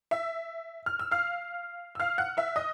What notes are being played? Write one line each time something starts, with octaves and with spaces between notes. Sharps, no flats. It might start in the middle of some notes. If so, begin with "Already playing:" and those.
E5 E6
F6
E6
F5 F6
E6
F5 F6
F#5 F#6
E5 E6
D#5 D#6